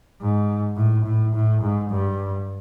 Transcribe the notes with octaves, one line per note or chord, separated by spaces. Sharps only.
G#2
A2
A2
A2
G#2
G2